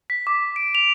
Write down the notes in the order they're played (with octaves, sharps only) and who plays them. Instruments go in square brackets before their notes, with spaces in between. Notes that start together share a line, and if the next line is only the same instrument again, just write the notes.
[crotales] B6
D6
D7
F7